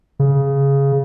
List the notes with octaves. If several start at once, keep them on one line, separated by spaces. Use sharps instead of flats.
C#3